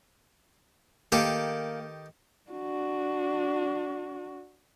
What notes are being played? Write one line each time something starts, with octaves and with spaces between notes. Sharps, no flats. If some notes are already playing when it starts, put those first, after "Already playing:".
D#3 A#3 G4 A4
D4 F#4